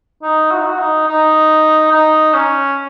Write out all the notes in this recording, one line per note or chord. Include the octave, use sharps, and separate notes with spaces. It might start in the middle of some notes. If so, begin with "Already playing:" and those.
D#4
F#4
D#4
F#4
D#4
D#4
D#4
C#4